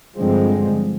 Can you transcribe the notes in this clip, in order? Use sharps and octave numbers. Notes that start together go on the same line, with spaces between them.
G2 D3 F3 G#3 C4